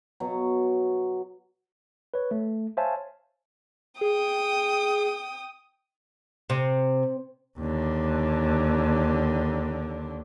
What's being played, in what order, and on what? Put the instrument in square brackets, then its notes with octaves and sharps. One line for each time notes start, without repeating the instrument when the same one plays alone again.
[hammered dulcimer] B2 F#3
[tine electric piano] B4 C#5
A3
C5 C#5 E5 F5 G#5 A5
[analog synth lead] G#4 [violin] G5 D#6
[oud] C3
[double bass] D#2 D3